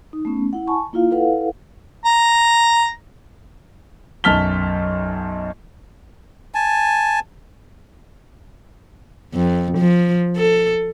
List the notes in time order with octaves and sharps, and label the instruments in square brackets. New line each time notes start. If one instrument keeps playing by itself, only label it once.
[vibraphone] D#4
A3 B3 C#4
E4 F#5
G#5 A5 B5 C#6
A#3 E4 F4 F5
E4 A4 B4 F5 F#5
[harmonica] A#5
[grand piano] B1 F#2 A5 F6 B6 G7
[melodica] G#5 A5
[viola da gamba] F2
F3
A4